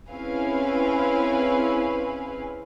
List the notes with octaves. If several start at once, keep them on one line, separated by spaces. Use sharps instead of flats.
C4 C#4 E4 G#4 B4 F5